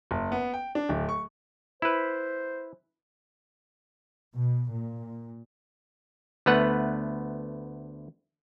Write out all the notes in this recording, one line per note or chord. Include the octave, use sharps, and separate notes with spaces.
F#1
B3
G5
D4
D1
C#6
E4 B4 C5
B2
A#2
D2 A3 B3 B4 F#5